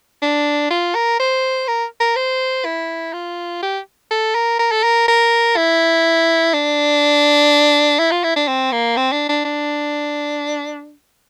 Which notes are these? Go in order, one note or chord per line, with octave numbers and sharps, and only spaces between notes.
D4
F4
A#4
C5
A#4
A#4
C5
E4
F4
G4
A4
A#4
A#4
A4
A#4
A#4
E4
D4
E4
F4
E4
D4
C4
A#3
C4
D4
D4
D4